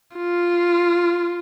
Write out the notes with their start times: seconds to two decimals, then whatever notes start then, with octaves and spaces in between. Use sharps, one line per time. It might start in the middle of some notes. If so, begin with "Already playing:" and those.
0.16 F4